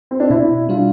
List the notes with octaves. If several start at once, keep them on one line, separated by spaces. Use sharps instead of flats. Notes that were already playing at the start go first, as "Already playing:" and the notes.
C4
D4
B2 E4
G3 D4 F4